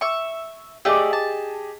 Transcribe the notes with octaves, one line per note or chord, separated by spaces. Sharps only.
E5 C#6
A3 G4 G#4 D5 D#5
A5